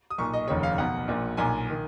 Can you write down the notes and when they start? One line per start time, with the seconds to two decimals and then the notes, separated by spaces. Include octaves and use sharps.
0.10 D#6
0.18 B1 A#2 C#6
0.33 D#5
0.48 F1 D#2 C#3 C#5
0.63 F5
0.78 B1 B2 F#5
1.08 A#1 A#2
1.37 B1 A#2 G#5
1.70 D#3